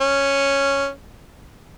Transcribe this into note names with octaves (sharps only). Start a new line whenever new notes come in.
C#4